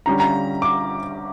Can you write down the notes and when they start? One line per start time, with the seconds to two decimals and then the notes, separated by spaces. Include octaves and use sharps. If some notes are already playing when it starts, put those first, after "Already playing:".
0.06 D3 G3 C#4 A#5
0.20 A#5
0.62 D6